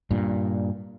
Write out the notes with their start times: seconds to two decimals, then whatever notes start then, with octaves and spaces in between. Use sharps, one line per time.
0.11 G2 A#2